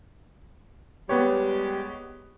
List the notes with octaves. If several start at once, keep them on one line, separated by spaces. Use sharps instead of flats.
G3 G#3 B3 G4 B4 C#5